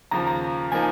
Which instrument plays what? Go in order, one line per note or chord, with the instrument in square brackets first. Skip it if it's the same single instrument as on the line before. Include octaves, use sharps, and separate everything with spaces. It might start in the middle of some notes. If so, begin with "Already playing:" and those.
[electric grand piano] D#2 C#3 F3 [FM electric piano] A#5
[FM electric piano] A#5
[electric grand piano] F3 A#3 D#4 [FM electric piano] G#5